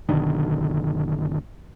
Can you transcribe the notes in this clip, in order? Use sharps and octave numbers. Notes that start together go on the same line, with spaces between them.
F#1 B2 D3 D#3